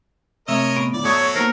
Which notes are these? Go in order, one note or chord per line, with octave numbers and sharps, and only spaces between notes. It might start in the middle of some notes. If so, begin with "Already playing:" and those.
C3 A3 C4 A#4 C#5 D#5 E5 E6
A2 B3
D2 E4 D5
F#3 A3 C#5 D5 E5 D#6
C5
A#3 B3 D#4 A#4 C5